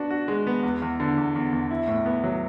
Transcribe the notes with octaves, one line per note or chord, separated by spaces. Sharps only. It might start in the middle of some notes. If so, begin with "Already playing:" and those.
Already playing: B3 D4 F#4
F#4
G#3
B3
E2
E2
D3
E2
E2
E2
E4
A2
B3
F#3